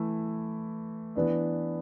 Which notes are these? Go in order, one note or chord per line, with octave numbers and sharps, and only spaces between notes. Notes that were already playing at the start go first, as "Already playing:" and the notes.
Already playing: E3 A3 E4
E3 B3 D4 B4 D5